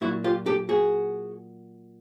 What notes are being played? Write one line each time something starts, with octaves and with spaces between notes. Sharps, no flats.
A#2 F#3 E4 F#4
F4 G4
G4 A4
F#4 G#4